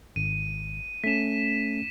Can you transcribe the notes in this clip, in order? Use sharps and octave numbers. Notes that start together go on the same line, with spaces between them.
G#1 D#7
A3 C#4 B6 E7